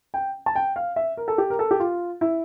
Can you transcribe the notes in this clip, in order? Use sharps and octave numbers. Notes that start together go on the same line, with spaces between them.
G5
A5
G5
F5
E5
A#4
A4
G4
A#4
A4
G4
F4
E4